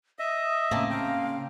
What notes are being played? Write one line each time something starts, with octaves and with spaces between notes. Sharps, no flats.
D#5 E5 D#6
A2 C#3 A#3 C4 A5
C#3 F5 G5